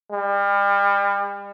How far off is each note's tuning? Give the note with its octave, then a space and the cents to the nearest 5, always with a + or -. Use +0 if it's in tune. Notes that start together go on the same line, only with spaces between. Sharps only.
G3 +40